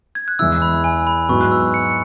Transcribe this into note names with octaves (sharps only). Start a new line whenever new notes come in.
G#6
F#6
E2 E3 G#3 E4 E6
B5
G#5
B5
G#2 F#3 B3 C#6
F#6
E6
C#7